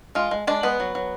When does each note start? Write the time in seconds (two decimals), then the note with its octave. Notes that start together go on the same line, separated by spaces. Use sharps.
0.15 G#3 F4
0.31 G#3
0.47 G#3 D4 D5
0.63 G#3 B3 B4
0.80 F#3
0.95 F#3